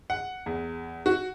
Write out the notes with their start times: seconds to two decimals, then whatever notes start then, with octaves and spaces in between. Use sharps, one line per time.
0.10 F#5
0.46 E2
1.06 F#4